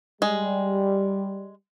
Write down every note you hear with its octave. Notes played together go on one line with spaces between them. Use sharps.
G3 G#3